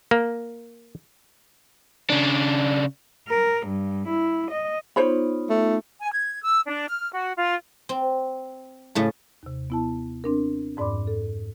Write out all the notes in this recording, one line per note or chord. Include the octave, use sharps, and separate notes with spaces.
A#3
C#3 D4
A#4
G2
E4
D#5
B3 D#4 F4 C5 C#5 B5
A3
G#5
G#6
E6
D4
F6
F#4
F4
C4
A2 C#3 A3
D#2 C3
B3 E4 A5
C4 D4 A#4
F2 G#2 D5 B5 C6 D6
A4